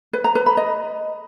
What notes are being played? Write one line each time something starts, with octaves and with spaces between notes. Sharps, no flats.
B4
A#5
B4
B5
D#5